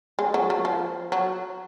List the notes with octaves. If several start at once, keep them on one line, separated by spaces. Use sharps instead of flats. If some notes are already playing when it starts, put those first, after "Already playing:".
G#3
F#3
F#3
F3
F#3